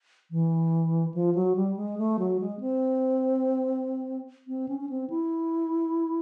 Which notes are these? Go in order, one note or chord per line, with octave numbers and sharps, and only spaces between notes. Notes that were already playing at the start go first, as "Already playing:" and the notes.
E3
F3
F#3
G3
G#3
A3
F#3
G#3
C4
C4
C#4
C#4
C4
E4